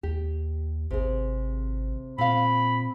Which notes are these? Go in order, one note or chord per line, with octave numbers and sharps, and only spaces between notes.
D#2 G4
G#1 C3 G#4
A#2 C4 F5 B5